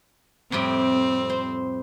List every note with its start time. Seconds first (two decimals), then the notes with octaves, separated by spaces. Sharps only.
0.52 F2 A2 G3 C4
1.30 C5